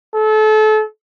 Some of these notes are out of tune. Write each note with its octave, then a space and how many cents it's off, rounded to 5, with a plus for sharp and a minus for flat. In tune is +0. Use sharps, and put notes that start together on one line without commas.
A4 -30